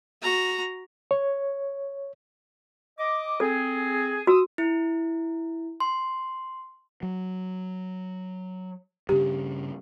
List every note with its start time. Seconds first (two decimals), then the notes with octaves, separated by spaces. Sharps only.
0.22 F#4 A#5
1.11 C#5
2.99 D#5 D6
3.40 C4 G#4 A4
4.27 F#4 D#6 E6
4.58 E4
5.80 C6
7.03 F#3
9.09 G2 C#3 G4